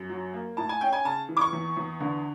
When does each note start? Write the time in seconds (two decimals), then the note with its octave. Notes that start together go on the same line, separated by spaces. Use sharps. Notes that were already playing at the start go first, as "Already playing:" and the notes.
Already playing: F#2
0.10 F#3
0.33 A#3
0.57 A2 A5
0.69 G#5
0.81 C#4 G5
0.93 G#5
1.05 C#3 A5
1.29 E3
1.37 D6
1.41 C#6
1.53 E2
1.77 E2
2.00 D3